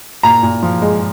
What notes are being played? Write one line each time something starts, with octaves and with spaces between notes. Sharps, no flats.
A#2 A#5
A#2
F3
G#3